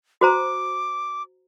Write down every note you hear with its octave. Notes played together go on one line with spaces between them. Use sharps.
F#4 C5 A#5 D6